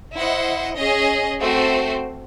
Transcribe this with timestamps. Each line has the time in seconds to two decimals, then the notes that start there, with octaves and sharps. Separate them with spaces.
0.17 E4 C5 D#5 F#5
0.78 C#4 G#4 D#5
1.40 A3 C4 F#4 C5